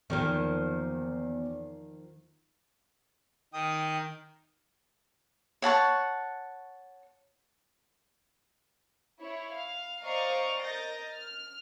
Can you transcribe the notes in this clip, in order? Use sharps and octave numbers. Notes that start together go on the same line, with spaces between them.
E2 D#3 F3 A#3 G7
D#3 G5 D#6
C#5 F#5 A5 C#6
E4 C#5
F5
C5 D5 D#5 F5 A#5 C#6
A#4 D#5 G6 A6 A#6
F6